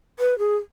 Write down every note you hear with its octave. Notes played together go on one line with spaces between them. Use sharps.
B4
G#4